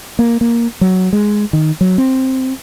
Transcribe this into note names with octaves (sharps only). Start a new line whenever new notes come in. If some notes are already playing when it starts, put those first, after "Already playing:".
A#3
A#3
F#3
G#3
D#3
F#3
C4